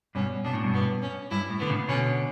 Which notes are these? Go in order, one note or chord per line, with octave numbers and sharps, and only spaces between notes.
G2 B2 C#4
B2 D4
A2
G2 B2
B3
C#4
G2 E4
A2
D3 B3
A2 C#3
B2 D3 C#4